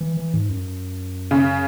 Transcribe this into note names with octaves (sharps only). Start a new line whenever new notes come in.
E3
E3
G#2
F#2
C#3